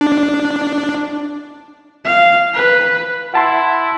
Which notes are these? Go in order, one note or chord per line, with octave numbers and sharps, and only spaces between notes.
D4
F5
B4
E4 F#5 A5 C6